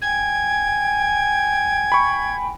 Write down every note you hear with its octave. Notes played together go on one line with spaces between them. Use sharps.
G5 G#5 G#6
B5 C#6